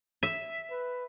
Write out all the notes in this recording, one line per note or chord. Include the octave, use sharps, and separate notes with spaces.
E5
B4